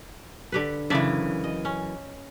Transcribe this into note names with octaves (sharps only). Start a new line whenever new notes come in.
D3 G4 B4
F#2 C#3 E3 D4 D5 E5
D#5
C#4